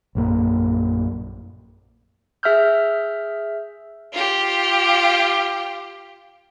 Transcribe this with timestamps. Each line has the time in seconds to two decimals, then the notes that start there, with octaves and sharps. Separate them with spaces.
0.15 A#1 F#2 A#3
2.43 G#4 E5 E6 F6 G6
4.13 F4 G4